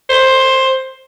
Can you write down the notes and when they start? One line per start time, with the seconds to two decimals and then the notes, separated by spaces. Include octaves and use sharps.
0.10 C5